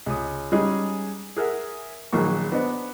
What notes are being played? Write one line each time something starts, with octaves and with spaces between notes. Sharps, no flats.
C#2 D#6
G3 G#3 C#4 D#4 G#4
G#4 A#4 E5 F#5
A#1 D#3 F#3 G#3 A#3 C#6
B3 D4 C5 D#5